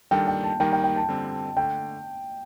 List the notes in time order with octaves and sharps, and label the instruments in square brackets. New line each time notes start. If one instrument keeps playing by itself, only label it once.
[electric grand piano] D#3 G3 D4 A4 [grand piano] G5
[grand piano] G5
A5
[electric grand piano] D#3 G3 A#3 D#4 [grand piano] G5
[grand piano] G5
G5
A5
[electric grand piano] D3 G3 C4
[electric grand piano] D3 A3 [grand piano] G5